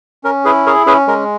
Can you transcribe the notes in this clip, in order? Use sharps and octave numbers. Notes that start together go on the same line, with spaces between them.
C#4 A#4
E4 G#4 B4
G#4 A#4 C#5
C#4 G#4 B4
G#3 A#4